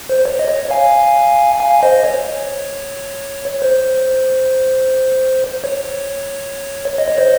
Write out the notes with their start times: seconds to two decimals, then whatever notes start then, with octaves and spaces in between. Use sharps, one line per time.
0.09 C5
0.25 C#5
0.39 D#5
0.49 C#5
0.70 F5 G#5
1.60 F5 G#5
1.83 C5 D#5
2.04 C#5
3.62 C5
5.64 C#5
6.98 D#5
7.08 C#5
7.18 C5 D#5